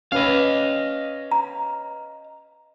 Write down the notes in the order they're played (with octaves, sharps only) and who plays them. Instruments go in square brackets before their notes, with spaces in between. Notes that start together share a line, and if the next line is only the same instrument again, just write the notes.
[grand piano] C#4 B4 [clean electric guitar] D#5 F5
[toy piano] A#5